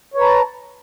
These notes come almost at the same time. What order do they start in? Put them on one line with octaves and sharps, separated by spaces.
C#5 B4 A#5 A5